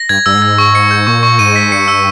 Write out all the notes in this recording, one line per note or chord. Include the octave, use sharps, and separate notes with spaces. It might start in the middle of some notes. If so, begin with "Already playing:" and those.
Already playing: A#6
G2 G#6
G2 E6
G#2
G#6
C#6
C#7
G6
A#2 C#6
C#6
G#2 D#7
B6
G2 C#7
E6